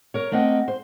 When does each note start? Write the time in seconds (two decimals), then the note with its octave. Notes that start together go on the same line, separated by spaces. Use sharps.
0.14 A#4 C#5
0.32 A3 A#3 C4 D#5 F#5
0.68 C5